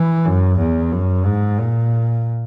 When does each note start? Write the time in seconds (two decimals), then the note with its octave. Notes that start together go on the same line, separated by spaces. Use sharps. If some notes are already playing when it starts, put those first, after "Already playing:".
Already playing: E3
0.25 F#2
0.59 E2
0.91 F#2
1.25 G#2
1.58 A#2